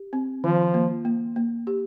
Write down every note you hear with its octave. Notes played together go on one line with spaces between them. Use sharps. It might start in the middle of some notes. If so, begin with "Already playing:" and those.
Already playing: G4
C4
D#3 F3
A#3
A#3
A#3
G4